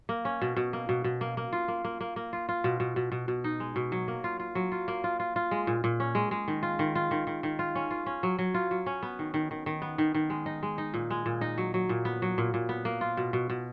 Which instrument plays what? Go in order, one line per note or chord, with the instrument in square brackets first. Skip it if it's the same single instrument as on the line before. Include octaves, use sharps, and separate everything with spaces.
[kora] A#3
C#4
B2
B2
A#3
B2
B2
A#3
A#3
F4
A#3
A#3
A#3
A#3
F4
F4
B2
B2
B2
B2
B2
D#4
G#3
B2
F#3
A#3
F4
F4
F#3
F4
A#3
F4
F4
F4
G#3
A#2
A#2
C#4
G#3
G#3
D#3
F4
D#3
F4
D#3
D#3
D#3
F4
C#4
F4
C#4
F#3
F#3
F4
F#3
C#4
B3
D#3
D#3
D#3
D#3
B3
D#3
D#3
G#3
D#4
G#3
D#4
A#2
G#3
A#2
D#4
F#3
F#3
A#2
B3
F#3
A#2
A#2
B3
A#3
F4
B2
B2
B2